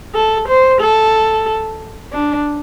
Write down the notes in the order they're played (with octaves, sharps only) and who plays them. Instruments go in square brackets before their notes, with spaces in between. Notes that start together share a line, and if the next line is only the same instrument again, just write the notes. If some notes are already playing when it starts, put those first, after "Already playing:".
[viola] A4
C5
A4
D4